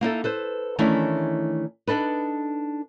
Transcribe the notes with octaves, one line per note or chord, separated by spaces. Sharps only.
A#3 D#4 E4 A4
A4 B4 C5
D#3 E3 A3 C#4 D4 E4
D4 D#4 A4 B4